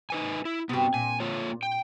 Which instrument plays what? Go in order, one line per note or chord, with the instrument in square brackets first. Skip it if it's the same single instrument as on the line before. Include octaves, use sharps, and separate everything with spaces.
[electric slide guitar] D#4 B4 G#5
E4
[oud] G2 C3 [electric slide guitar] B3 F#4
[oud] A#2 [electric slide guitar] G#5
[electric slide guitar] A#3 F4 C#5
G5